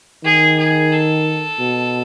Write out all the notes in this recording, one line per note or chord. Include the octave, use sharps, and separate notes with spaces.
D#3 G#4
G#4
A4
B2